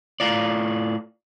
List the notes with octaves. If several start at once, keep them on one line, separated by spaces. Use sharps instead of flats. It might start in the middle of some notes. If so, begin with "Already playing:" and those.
A2 F4 D5